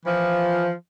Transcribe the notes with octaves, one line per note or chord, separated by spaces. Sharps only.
E3 F3